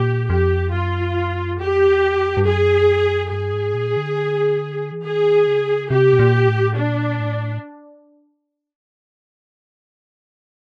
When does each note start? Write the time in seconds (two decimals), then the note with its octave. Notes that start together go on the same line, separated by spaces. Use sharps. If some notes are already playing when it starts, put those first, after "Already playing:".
Already playing: A#2 G4
0.30 F2 G4
0.73 F#2 F4
1.59 F2 G4
1.88 E2
2.17 F2
2.37 G2
2.45 F#2 G#4
3.31 G2 G#4
3.53 G#2
3.74 A#2
3.97 D3
4.92 E3
5.04 D#3 G#4
5.47 C#3
5.90 C3 G4
6.13 B2
6.19 A#2
6.48 A2
6.76 A#2 D4
7.20 A2